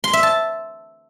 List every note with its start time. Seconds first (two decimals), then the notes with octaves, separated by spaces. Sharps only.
0.04 C6
0.13 E5
0.23 A5